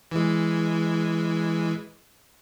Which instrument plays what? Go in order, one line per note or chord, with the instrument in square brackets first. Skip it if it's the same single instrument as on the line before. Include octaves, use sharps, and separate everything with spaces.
[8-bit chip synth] E3 G#3